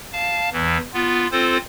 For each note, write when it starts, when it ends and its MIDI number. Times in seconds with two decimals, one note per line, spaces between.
0.13 0.50 77
0.13 0.50 81
0.53 0.78 40
0.53 0.78 52
0.94 1.27 59
0.94 1.27 65
1.32 1.57 60
1.32 1.57 65
1.32 1.57 69
1.32 1.57 72